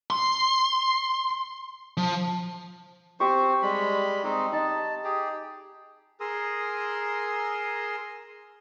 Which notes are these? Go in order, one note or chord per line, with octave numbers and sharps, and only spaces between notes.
C6
F3
C4 G4 C5 C#6
G3 G#3 B5
G#3 C4 D#4 D#6
D#4 A5
G4 G#4
G#4 A#4 A#5 C6 D#6 E6